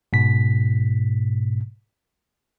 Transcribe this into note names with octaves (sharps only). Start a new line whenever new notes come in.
G#2 B2 B6